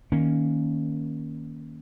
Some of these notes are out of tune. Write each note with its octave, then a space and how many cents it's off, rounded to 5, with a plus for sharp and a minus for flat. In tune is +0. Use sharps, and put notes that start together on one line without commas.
D#3 +0 A#3 +0 C#4 +0